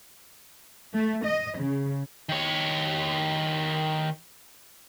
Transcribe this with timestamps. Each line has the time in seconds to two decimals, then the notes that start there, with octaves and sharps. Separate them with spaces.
0.94 A3
1.26 D#5
1.59 C#3
2.29 D#3 C#5